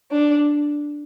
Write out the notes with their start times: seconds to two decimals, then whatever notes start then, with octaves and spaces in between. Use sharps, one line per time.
0.11 D4